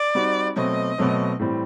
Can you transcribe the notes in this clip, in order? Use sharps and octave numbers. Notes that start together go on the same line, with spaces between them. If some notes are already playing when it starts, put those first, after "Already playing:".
Already playing: D5
G3 C4 D#4 F#4
B2 F#3 A3 C4 D#5
B2 F#3 A3 C4
A2 E3 G3 C4